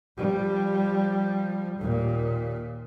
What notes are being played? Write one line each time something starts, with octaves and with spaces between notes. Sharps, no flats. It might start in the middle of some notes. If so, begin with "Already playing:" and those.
F3 G3
D#2 A#2